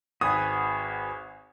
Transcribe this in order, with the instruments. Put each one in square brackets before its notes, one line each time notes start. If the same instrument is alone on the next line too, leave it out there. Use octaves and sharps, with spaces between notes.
[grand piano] G#1 [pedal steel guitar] F#4 G#4 B4 [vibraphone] F#5 G#5 B5 [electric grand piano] D#6